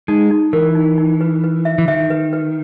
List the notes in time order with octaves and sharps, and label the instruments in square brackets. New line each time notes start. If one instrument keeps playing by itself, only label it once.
[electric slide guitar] G#3 [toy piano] D#4
[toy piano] D#4
[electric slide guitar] E3 [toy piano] A#4
[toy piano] D#4
D#4
B4
B4
E5
[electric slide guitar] E3
[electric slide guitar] D#3 [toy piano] E5
[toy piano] B4
B4